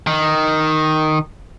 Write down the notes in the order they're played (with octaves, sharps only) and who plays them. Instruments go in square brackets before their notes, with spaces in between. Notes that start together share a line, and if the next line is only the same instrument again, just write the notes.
[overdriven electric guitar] D#3